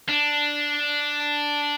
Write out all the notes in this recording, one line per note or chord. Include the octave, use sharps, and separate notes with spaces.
D4